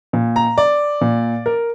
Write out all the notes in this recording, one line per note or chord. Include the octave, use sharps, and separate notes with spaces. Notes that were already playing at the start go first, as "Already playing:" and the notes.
A#2
A#5
D5
A#2
A#4